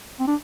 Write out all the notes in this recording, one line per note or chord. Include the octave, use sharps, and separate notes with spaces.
C4
D4